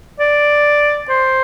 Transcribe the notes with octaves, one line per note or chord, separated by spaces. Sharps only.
D5
C5